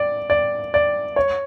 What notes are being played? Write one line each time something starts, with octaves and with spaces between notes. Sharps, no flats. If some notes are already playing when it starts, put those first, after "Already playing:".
Already playing: D5
D5
D5
C#5